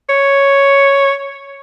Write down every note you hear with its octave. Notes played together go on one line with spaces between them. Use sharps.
C#5